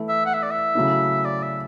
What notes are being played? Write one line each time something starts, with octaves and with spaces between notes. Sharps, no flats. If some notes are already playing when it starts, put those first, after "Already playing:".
Already playing: E3 A3 E4
E5
F#5
E5
D5
E5
C#3 F#3 A3 E4
D5
E5